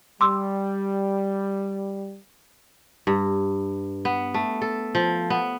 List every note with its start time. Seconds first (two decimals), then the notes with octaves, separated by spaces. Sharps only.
0.21 G3 C6 D6 E6
3.07 G2
4.05 B3
4.34 A3
4.62 A4
4.95 F3
5.30 B3